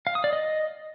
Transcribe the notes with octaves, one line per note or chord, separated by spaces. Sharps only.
F5
D#6
D5
D#5